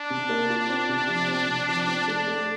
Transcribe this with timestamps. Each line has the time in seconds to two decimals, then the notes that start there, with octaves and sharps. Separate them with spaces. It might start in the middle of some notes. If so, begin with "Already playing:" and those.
Already playing: D4
0.10 C3
0.29 A#3
0.50 F4
0.69 C4
0.89 C3
1.08 F3
1.28 C4
1.48 C3
1.69 F3
1.88 C4
2.08 A3 D4
2.27 A3